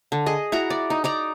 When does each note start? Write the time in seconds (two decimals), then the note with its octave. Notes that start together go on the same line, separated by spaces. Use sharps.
0.12 D3
0.26 G#4 D#5
0.52 E4 F#4 A#5
0.70 D5
0.90 D#4
1.04 D#4 D5 A#5